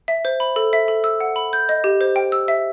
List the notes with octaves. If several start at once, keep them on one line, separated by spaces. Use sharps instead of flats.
E5
C5
B5
A4
E5
A4
E6
F#5
B5
G6
D#5
G4
C5
G5
E6
E5